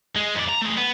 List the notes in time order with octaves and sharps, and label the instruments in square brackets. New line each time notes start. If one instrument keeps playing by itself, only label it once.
[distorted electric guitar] G#3
F2 D5
A#5
A3 G#4
B3